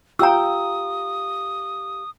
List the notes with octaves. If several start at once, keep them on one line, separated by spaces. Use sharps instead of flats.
F4 G4 F5 G5 A#5 D#6 E6